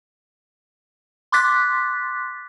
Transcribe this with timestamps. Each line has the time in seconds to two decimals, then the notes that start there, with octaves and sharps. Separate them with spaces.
1.32 C6 D6 F#6 A6 B6